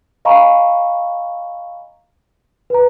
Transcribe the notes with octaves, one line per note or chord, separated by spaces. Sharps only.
D#5 F5 G#5 A#5 B5 C#6
B4 A#5